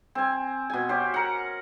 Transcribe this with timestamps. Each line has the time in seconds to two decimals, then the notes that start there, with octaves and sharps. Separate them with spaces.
0.15 C4 G#5
0.70 B2 G#5
0.89 C#4 G4 C5
1.14 A#4 F#5